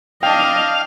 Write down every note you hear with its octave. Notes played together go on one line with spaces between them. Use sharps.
D4 D#5 F5 G5 A5